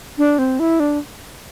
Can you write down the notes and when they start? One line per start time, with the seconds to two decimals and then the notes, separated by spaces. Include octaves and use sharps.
0.18 D4
0.39 C4
0.60 E4
0.80 D4